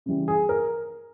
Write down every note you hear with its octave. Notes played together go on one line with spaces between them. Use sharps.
C#3 E3 G3
G#4
A#4